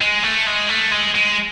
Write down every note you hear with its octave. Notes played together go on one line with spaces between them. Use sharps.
G#3
A3
G#3
A3
G#3
G#3